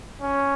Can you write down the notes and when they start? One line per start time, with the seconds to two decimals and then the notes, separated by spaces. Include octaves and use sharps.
0.21 C#4